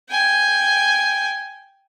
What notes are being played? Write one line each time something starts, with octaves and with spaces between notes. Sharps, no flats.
G5 G#5